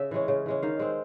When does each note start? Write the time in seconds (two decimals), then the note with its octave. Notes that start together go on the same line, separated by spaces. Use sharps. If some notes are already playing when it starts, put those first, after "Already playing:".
Already playing: C#3 E5
0.11 E3 G#3 C#4
0.28 C#3
0.46 E3 G#3 C#4
0.62 D#3 F5
0.79 G#3 C4